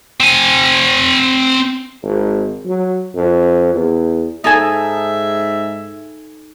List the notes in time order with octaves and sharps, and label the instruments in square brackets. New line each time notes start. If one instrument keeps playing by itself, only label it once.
[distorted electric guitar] C4 G#5
[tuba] G#1
F#3
F2
E2
[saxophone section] G#2 G#4 E5 [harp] D#4 A4 G#5